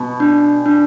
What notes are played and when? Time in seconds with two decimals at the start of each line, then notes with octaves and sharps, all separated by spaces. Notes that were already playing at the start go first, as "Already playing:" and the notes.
Already playing: B2
0.20 D4
0.66 D4